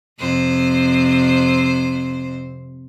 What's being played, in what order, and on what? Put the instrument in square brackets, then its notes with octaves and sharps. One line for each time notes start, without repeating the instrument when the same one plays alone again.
[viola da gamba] F2 C3 C5